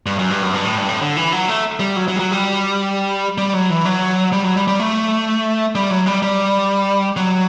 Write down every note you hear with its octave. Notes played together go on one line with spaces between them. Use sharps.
G2
F#2
G2
F#2
G2
A2
G2
A2
D3
E3
F#3
A3
G3
F#3
F#3
G3
F#3
G3
G3
F#3
E3
F#3
G3
F#3
G3
G3
A3
G3
F#3
G3
G3
F#3